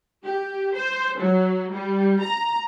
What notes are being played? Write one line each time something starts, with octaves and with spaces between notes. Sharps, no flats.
G4
C5
F#3
G3
A#5